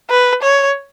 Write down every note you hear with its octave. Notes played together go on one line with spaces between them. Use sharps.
B4
C#5